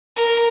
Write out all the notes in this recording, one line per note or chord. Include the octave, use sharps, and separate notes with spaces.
A#4